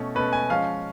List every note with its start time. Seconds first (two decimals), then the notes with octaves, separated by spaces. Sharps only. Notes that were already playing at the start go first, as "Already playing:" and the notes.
Already playing: B2 A3 C#4
0.15 B2 A3 C#4 B4
0.33 G#5
0.50 F3 G#3 C#4 F5